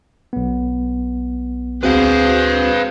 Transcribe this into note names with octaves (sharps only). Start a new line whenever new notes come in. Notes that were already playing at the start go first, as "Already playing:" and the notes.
B1 B3
D2 C4 F#4 G#4 B4 C5 F5